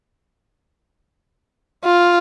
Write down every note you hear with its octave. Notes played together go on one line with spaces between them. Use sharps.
F4